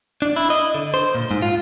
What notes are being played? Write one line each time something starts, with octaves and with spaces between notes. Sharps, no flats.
D4
E4
D#5
D3
C5
A#2
G#2
F4